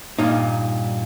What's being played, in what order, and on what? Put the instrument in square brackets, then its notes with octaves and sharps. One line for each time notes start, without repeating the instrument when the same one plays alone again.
[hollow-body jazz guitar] G2 A#2 D#4